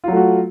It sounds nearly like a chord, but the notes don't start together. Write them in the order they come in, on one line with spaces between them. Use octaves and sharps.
F4 F#3 A3 F#4